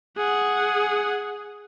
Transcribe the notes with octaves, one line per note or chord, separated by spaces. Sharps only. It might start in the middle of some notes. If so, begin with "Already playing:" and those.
G#4 F#5